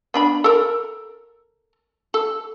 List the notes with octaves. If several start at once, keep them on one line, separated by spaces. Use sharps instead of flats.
B3 D4 B5
A4 A#4
A4